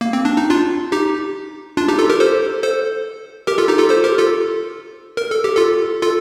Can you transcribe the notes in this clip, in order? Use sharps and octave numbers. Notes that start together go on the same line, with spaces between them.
A#3
C4
D4
D#4
D4 F4
D#4 G4
D4 F4
D#4 G4
F4 A4
G4 A#4
A4 C5
A4 C5
G4 A#4
F4 A4
D#4 G4
F4 A4
A4 C5
G4 A#4
F4 A4
A#4
A4
G4
F4 A4
F4 A4